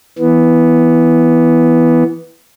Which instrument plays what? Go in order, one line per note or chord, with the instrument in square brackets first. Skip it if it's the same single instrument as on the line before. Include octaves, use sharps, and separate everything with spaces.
[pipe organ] E3 B3